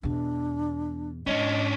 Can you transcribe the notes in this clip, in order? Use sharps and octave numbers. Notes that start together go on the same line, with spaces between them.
E2 B2 D4
G#2 C#4 D4 D#5